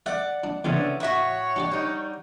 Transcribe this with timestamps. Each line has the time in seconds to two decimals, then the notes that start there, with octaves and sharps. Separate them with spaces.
0.06 D5 E5 F#5
0.44 D4
0.64 E2 C#3 A3 B3 C#4 D4 E4 C5
1.00 A2 F#4 C#5 E5 F#5 C#6
1.56 D4 G4 D5
1.71 G3 D#4